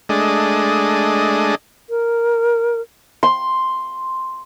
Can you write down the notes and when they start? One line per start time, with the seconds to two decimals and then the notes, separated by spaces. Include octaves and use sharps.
0.09 G#3 A3 D4 D#5
1.90 A#4
3.23 C6